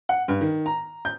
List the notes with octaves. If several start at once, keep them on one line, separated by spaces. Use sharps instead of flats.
F#5
G2
D#3
A#5
G6